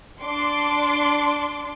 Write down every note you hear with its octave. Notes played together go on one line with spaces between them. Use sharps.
D4 C6 D6